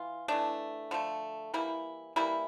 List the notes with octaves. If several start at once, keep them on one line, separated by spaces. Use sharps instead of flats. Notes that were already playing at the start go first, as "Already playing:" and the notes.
Already playing: E3 F4
E3 A3 D4
D3 F3 A3
E3 G3 A#3 E4
E3 G3 A#3 E4